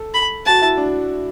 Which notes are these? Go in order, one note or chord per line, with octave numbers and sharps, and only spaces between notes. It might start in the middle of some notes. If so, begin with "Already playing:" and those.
Already playing: A4
B5
F#4 A5
E4
D4